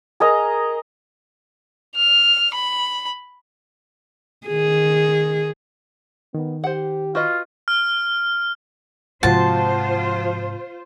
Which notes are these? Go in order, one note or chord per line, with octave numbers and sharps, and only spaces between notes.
G#4 A#4 D#5 A#5
F6
B5
D#3 G#4
D#3 B3
G4 C5 F#5
F4 F#4 B4 D#5
F6
G#2 C3 F3 F4 F#4 C5 A5